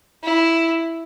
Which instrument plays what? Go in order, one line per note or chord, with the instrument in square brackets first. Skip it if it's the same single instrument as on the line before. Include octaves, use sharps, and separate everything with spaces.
[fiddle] E4